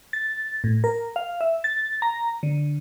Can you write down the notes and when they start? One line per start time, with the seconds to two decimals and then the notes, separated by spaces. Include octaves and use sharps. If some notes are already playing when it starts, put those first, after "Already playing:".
0.13 A6
0.64 A2
0.84 A#4
1.16 F5
1.41 E5
1.64 A6
2.02 A#5
2.43 D3